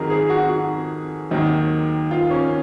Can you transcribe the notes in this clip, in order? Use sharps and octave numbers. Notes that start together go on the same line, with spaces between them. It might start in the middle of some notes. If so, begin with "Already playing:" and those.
Already playing: F2 D#3 F#3 G#4 A#4
G#4
F#4
F#4
D#2 D#3 F#3
F4
C#4